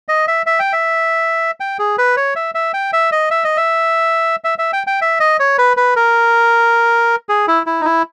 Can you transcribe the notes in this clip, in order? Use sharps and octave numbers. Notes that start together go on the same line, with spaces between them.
D#5
E5
E5
G5
E5
G5
G#4
B4
C#5
E5
E5
G5
E5
D#5
E5
D#5
E5
E5
E5
G5
G5
E5
D#5
C#5
B4
B4
A#4
G#4
E4
E4
D#4
E4